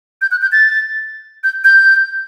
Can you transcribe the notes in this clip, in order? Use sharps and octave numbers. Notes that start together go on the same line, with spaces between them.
G6
F#6
G6
A6
G6
G6